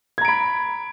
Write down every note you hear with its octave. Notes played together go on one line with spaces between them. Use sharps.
A#5 B5 G#6 D7